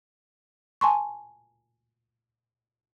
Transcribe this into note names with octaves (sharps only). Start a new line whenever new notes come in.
G#5 A5 C6 C#6